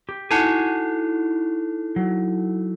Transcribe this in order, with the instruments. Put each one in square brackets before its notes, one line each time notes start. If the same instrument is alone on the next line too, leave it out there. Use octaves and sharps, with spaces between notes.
[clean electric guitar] G4
[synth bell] D#4 E4 A4 [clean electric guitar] F#4 F#5 G#5
[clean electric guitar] F#3